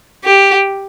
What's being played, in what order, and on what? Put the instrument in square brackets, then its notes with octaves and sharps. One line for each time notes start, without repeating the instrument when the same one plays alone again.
[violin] G4